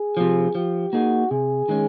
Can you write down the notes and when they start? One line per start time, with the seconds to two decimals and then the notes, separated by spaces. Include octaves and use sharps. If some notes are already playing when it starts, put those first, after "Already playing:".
Already playing: G#4
0.17 C3 F3
0.55 F3 G4
0.93 A#3 D#4 F#4 G#4
1.30 C3 G#4
1.68 D#3 G#3 C#4